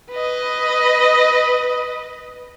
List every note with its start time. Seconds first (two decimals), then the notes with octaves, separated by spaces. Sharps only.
0.11 B4 D#5